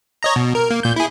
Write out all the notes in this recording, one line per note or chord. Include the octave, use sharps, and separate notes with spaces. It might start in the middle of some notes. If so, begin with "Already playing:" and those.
C#5 D#5 A#5
B2
A#4
A#3
A#2 G6
E4 G#4